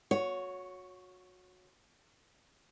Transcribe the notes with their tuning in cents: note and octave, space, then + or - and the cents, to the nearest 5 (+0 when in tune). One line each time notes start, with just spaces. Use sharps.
F#4 -25 C#5 +5